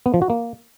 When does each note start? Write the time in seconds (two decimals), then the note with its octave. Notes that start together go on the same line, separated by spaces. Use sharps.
0.06 B3
0.14 F3
0.22 F#4
0.30 A#3